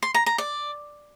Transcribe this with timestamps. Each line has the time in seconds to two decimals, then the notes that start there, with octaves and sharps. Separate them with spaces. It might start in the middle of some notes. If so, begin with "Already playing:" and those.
0.03 C6
0.14 A#5
0.26 A#5
0.38 D5